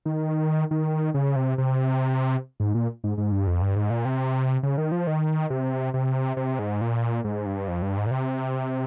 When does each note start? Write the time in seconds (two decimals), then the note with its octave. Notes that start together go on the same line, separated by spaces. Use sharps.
0.05 D#3
0.71 D#3
1.14 C#3
1.36 C3
1.58 C3
2.60 G#2
2.75 A#2
3.04 G#2
3.18 G#2
3.32 G2
3.47 F2
3.62 G2
3.76 G#2
3.90 A#2
4.05 C3
4.63 C#3
4.78 D#3
4.92 F3
5.07 D#3
5.50 C3
5.94 C3
6.37 C3
6.59 G#2
6.81 A#2
7.24 G#2
7.46 G2
7.68 F2
7.82 G2
7.97 G#2
8.07 A#2
8.11 C3